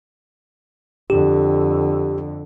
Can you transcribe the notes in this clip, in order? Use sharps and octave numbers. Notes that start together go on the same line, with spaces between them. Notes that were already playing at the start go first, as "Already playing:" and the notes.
F2 D3 G4